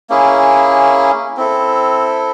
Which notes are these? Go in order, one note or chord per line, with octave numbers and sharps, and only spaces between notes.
A#3 C#4 E4 G#4
C4 E4 A4